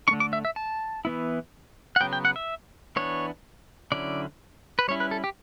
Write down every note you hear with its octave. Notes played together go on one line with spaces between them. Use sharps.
D4 C#6
D3 A3
D6
E5
E5
A5
E3 B3 E4
F#5
C#3 F#3 B3 G5
G5
F#5
E5
E3 B3 D4 C#5
D3 F#3 C#4 E4 D5
B4
G3 C#4 E4 C#5
B4
A4
G4